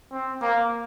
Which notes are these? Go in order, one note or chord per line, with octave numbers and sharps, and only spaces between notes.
C4
A#3